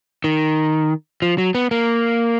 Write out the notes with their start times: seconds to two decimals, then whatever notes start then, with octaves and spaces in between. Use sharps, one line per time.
0.24 D#3
1.22 F3
1.38 F#3
1.55 B3
1.71 A#3